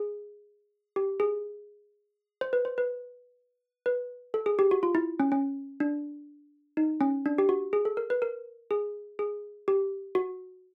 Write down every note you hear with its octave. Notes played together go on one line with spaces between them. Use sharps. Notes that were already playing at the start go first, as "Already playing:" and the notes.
Already playing: G#4
G4
G#4
C5
B4
C5
B4
B4
A4
G#4
G4
F#4
F4
E4
C#4
C#4
D4
D#4
C#4
D4
G4
F#4
G#4
A4
A#4
B4
A#4
G#4
G#4
G4
F#4